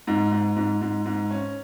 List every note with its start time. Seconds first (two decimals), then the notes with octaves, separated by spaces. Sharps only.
0.07 G#2
0.32 G#2
0.56 G#2
0.81 G#2
1.06 G#2
1.30 C#4